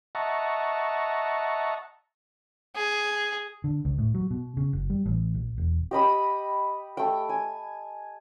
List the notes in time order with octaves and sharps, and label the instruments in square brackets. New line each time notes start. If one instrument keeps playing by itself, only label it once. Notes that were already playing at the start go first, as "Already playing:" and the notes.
[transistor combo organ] D#5 E5 F#5 A5 A#5 C#6
[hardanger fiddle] G#4
[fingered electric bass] D3
C#2
A2
F#3
B2
C#3
F#1
G3
A1
A#1
E1
[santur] G4 D#5 B5 D#6
A3 G5
G#5